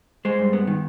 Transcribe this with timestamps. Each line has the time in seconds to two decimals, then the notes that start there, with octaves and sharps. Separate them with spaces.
0.25 G#3 C5
0.39 G2
0.53 B3
0.67 D#3